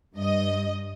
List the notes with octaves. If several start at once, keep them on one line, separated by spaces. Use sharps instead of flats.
G2 D#5